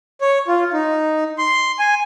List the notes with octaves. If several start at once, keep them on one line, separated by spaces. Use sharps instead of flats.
C#5
F4
D#4
C6
G#5